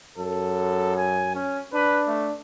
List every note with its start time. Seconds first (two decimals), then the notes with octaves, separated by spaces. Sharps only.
0.18 F#2 A4
0.96 G#5
1.35 C#4
1.74 D4 B4
2.08 A3